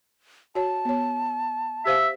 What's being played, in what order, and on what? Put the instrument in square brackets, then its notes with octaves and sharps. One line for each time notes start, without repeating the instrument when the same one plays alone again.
[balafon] F#4 C#5 [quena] A5
[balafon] B3 C#5
[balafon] G4 C5 F5 [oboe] E5